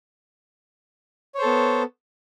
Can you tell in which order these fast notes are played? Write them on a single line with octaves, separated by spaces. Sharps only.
C#5 C5 A4 B3